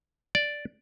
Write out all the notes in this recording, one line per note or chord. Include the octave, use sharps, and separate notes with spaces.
D5